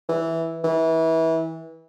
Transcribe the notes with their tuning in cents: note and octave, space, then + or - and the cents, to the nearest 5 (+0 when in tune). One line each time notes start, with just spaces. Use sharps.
E3 -5
E3 -25